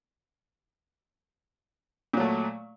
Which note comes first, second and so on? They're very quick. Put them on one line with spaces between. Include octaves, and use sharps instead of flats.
A#2 F#3 A3